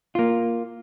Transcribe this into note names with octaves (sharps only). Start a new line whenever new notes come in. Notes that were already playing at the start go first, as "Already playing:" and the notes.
A#3 F4